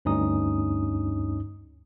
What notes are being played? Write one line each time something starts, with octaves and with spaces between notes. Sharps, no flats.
D2 G2 C#4 D#4 D#6